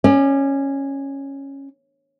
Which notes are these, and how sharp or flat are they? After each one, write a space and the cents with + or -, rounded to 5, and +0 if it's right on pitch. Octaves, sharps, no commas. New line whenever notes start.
C#4 -10 D5 +30